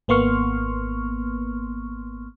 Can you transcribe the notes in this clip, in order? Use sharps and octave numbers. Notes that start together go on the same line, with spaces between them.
G#1 A#3 B3 C6 C#6 F6